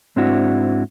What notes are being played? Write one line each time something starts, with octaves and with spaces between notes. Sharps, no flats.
G#2 C4 D4 E4 F#4